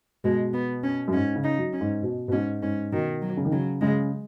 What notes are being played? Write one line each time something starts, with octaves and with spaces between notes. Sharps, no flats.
B2 G#3
B3
C#4
F#2
G#2 C#4
C#3
D#4
F#3
C#4
G#2
B2
B2
G#2 C#4
G#2 C#4
B2 D#3
F#3
C#3
D#3
C#3 F#3
C#3 G#3